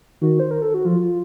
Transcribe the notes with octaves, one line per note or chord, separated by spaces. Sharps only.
D#3 F#4
C5
A#4
A4
F#4
F3 F4
F4